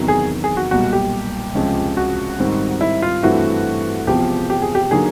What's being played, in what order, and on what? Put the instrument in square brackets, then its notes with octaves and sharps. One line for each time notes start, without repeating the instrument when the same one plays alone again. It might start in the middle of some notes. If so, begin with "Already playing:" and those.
Already playing: [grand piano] E2 C3 D#3 F#3
[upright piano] G#4
G#4
F#4
[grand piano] B1 A#2 G3 [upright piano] F#4
[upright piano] G4
[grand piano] C#2 C3 F3 G#3 C#4
[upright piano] F#4
[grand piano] G#2 D#3 G3 C4
[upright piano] E4
F4
[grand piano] G2 E3 A3 C4 E4 [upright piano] F#4
[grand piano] E1 E2 C3 F3 [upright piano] G4
[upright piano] G4
G#4
G4
[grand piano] D3 F#3 A#3 D#4 [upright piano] G#4